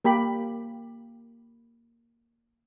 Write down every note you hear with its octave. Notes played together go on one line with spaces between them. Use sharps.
A#3 G4 B5